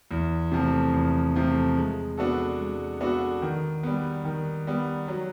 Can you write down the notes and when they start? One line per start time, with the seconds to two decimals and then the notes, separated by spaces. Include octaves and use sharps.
0.11 E2
0.52 C3 F3 A3
0.93 E2
1.35 C3 F3 A3
1.77 G#3
2.18 B3 D4 F#4 A4
2.60 G#3
3.00 B3 D4 F#4 A4
3.42 D#3
3.83 G3 B3
4.25 D#3
4.67 G3 B3
5.08 F#3